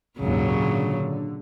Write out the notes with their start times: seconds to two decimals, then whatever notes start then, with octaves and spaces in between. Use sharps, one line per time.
0.19 G#1 D#2 A#2 C#3 F#3
0.60 D3